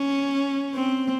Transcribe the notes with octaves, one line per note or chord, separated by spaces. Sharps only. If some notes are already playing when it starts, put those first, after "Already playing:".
Already playing: C#4
C4